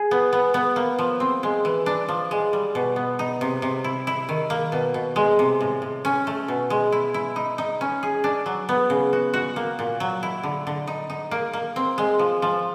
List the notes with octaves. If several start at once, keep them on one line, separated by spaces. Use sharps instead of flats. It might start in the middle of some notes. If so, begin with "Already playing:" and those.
Already playing: G#4
B3
B3
B3
A#3
F3
C4
G#3
E3
D4
F3
G#3
G3
B2
B3
D#4
C3
C3
E4
E4
D#3
A#3
B2
B2
G#3
C3
A2
A2
C#4
A3
B2
G#3
E4
E4
D#4
D#4
C#4
G#4
D4
F#3
B3
C#3
F#4
F#4
A#3
A#2
F#3
E4
D3
D3
D#4
D#4
A#3
A#3
C4
G#3
F3
F3